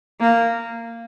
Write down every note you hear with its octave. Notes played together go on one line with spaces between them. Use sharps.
A#3